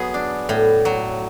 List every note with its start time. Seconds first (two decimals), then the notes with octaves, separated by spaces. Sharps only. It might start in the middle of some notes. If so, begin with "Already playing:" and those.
Already playing: F#3 B3 G#4
0.14 D4
0.49 A2
0.85 F#3